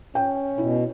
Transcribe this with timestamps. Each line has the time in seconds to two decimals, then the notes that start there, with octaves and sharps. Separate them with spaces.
0.15 C#4 G5
0.58 B2 E4